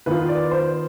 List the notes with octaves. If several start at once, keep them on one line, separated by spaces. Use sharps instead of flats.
D#3 B3 F4 B4
D5
C5